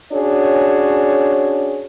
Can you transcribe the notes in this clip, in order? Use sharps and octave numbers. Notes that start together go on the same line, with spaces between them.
C#4 D4 F#4 G#4 C#5